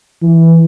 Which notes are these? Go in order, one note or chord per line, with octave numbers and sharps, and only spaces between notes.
E3